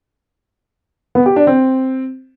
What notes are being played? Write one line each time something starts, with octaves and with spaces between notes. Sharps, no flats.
B3
G4
D4
C4